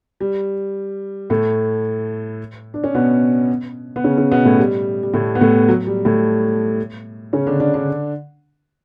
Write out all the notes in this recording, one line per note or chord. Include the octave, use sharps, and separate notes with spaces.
G3
A2 A3
D4
C#4
B2 B3
B3
C#3 C#4
C#3 C#4
B2 B3
A2 A3
G3
G3
A2 A3
B3
A2 A3
F#3
G3
A2 A3
C#3 C#4
D3 D4
D3 D4
D3 D4